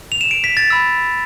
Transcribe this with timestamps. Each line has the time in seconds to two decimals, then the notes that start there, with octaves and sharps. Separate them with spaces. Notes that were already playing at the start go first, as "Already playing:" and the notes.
0.12 F7
0.21 E7
0.31 D7
0.44 B6
0.57 A6
0.70 B5 E6